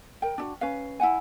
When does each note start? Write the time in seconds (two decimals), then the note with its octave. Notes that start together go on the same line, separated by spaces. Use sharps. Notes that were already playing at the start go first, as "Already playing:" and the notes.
0.22 A#4 G5
0.38 D4 E4 F#4
0.61 C#4 B4 F5
1.00 E4 F5 F#5 G#5